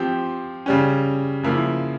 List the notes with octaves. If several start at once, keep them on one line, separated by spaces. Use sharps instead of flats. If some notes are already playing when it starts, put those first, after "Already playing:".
Already playing: F3 C4 G4
C#3 G3 C#4
C#3 F3 A#3 E4